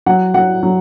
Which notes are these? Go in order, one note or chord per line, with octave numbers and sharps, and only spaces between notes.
F#3 F#5
F#3 F#5
F#3